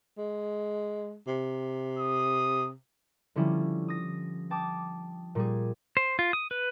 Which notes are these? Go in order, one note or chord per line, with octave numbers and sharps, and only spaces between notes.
G#3
C3
D#6
D3 F3 G3 C#4 E4
D#6 A#6
G5 A5 D6 D#6
A#2 G3 G#4
C5
F4
D#6
B4